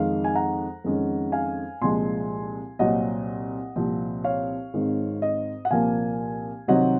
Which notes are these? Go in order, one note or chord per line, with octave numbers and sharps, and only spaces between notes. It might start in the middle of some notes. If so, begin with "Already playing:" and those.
Already playing: F2 D#3 G#3 F5
G#5
F#5 A#5
F2 D#3 G#3 C#4
F5 G#5
C2 A#2 F3 G#3 G#5 C6
C2 A#2 F#3 C4 D#5 F#5
C2 A#2 F3 C4
C#5 F5
G#1 G#2 D#3 G#3 C4
D#5
F#5
C2 A#2 F3 A#3 F5 G#5
C2 C3 D#3 F#3 C4 D#5 F#5